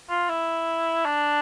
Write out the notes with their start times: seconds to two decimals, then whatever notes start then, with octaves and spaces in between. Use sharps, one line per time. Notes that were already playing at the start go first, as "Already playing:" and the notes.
0.09 F4
0.29 E4
1.05 D4